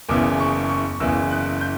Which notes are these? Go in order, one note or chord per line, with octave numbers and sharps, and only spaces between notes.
F#1 E2 C#3 E3 D6
C#6
C#6
F#1 E2 C#3 E3 E6
F#6
G6